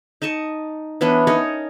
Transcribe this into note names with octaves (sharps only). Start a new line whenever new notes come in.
D#4 D#5 A5 C#6
E3 B3 C#4 D4
C#4 D#4 A#4 C#5